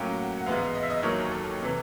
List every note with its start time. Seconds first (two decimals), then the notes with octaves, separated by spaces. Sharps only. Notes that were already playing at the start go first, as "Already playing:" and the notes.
Already playing: A2 F#3 A#3 C#4 F4 G5
0.19 F#5
0.38 F#5
0.46 G#2 E3 G#3 B3 E4 F5
0.75 D#5
0.83 E5
0.90 D#5
1.03 D#2 D#3 F#3 C#5
1.31 A4
1.62 C3 E3